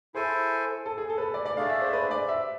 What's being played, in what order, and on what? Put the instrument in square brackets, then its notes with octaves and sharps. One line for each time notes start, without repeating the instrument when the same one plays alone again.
[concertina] E4 A4 C5 G#5 [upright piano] G#4
[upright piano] A4
G#4
A4
B4
A4
D5
D5
[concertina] A3 D4 G#4 D5 [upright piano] F5
[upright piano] E5
C5
B4
D5
E5